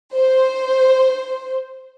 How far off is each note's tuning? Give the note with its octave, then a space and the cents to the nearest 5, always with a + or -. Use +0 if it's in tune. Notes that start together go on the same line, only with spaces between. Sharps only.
C5 +0